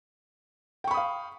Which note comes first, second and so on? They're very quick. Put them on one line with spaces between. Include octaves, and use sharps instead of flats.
G5 C#6 B5 D#6 F5